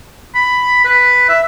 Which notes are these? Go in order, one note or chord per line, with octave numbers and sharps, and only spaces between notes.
B5
B4
E5